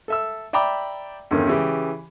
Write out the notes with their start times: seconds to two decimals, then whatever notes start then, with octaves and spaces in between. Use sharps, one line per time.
0.08 A4 E5 E6
0.53 D5 E5 G5 A#5 B5 D6
1.31 E2 G2 D3 D#3 C#4
1.47 C#3 E3 G4